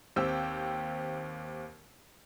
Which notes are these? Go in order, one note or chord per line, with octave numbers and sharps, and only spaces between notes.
D#2 C4 G4 G5 E6